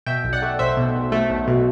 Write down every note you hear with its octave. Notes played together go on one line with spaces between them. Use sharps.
B2 E5 G5
B1
D5 F#5
A3
B1 C5 E5
B2
B1
A3
B1
B2